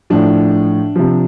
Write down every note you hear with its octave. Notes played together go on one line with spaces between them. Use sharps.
A2 F3 D4
C3 F3